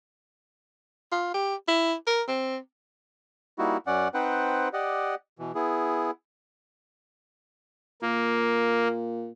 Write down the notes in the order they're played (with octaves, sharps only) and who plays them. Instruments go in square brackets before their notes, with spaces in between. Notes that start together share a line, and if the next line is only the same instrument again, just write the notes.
[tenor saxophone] F4
G4
E4
A#4
C4
[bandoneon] G3 A#3 D#4 E4 F#4
F#2 C#4 D5 F#5
C4 D#4 B4 C5 F#5 G5
G4 D5 D#5 F#5
B2 E3
B3 E4 G#4
[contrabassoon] A#2 [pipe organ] A#3